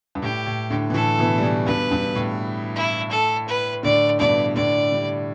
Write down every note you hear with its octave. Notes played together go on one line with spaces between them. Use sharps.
G2
A2 G4
A2
A2 D3
E3
A2 D3 A4
B2 E3
G3
B2 E3
G2 B2 B4
G2
A2
E4
A4
B4
A2 D3 D5
G2 B2 D5
A2 D3 D5
D3 G3